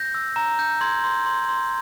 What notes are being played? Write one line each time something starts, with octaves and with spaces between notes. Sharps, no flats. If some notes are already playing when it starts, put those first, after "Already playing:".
Already playing: G6 A#6
E6
A#5
G6
C6 G#6
C6
C6
C6